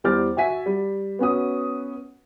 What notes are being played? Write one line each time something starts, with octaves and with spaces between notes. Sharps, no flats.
E2 G3 C5 D6 F6 A6
F#4 E5 G#5 B6
G3
B3 C#4 F#4 D#6